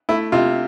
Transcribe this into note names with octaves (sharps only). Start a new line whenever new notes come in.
A3 E4
C3 F4